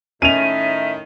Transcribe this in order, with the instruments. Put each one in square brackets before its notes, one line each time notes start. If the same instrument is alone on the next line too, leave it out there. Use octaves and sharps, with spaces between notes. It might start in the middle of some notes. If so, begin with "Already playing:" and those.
[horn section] A2 D#3 [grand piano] C#4 [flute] E5 [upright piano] D#7 F7